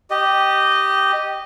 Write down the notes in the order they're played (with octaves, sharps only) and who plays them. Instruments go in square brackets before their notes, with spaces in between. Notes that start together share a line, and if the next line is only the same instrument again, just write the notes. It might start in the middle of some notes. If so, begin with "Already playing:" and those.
[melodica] G4 D#5